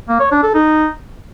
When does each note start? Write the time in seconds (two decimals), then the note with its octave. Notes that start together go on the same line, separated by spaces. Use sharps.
0.09 A#3
0.20 C#5
0.32 D4
0.43 A4
0.54 D#4